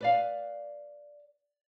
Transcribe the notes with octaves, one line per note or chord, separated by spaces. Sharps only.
B4 D5 F5